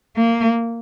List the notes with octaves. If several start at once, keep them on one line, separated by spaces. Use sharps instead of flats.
A#3